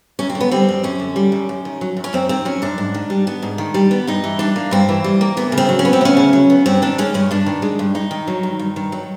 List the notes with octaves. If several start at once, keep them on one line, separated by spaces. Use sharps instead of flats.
F#2 C#4
C4
D3
B3
G3 C4
F#2
F#2 C#4
D3
G3
F#2
F#2
D#3
F#3
F#2
C#4
F#2 C4
D#3 C4
F#3 C#4
F#2 D4
G#2
D#3
G3
B3
G#2
D#3
G3
B3
G2 D#4
E3
G3 D4
A#3
G2 C4
E3
G3
A#3
D2 B3
C#3
C4
F#3
C#4
B3
C4
D2 C#4
C#3
F#3
B3
G2 C4
D#3 D4
G#3 C#4
G2 C#4
G2 D4
D#3
G#3
G2
G2 D#4
D#3
F#3
G2
G2
D#3
F#3